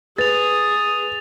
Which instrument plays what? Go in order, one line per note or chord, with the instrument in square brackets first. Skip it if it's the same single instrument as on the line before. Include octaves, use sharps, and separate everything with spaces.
[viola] G#4 [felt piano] B4 [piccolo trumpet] D#6 [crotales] A6 F7